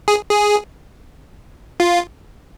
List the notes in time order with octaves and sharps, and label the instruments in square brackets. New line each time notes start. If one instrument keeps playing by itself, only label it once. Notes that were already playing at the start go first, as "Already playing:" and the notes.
[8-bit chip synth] G#4
G#4
F4